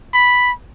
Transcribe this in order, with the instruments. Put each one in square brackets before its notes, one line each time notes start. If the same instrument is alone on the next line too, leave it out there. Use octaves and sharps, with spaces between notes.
[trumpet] B5